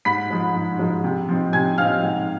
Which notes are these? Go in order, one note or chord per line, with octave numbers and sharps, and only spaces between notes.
G#2 B5 B6
F3 G#3
G#2
F3 G#3
C3
F3 C4 D#4
C3 G#5 G#6
F3 C4 D#4 F5 F6
G#2